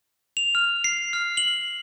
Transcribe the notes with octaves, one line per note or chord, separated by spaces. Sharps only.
F7
F6
C7
F6
F#7